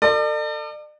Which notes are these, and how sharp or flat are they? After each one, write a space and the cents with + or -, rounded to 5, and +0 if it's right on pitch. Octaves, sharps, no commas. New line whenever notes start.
A4 +40 D5 +40